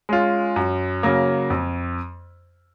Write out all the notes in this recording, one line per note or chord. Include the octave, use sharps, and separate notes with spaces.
G#3 C#4 F4
F#2
C#3 F#3 A#3
F2